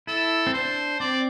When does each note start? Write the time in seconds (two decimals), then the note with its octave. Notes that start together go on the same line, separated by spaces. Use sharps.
0.07 E4 A4
0.47 C4
0.53 D4 C5
1.00 C4 D5